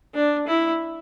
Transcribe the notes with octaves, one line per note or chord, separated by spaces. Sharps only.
D4
E4